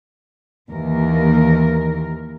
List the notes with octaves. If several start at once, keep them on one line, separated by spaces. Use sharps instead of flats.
D#2 E3 A#4